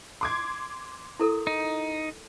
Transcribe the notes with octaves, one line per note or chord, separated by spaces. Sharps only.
C6 D6 G#6
E4 A4 A#4
D#4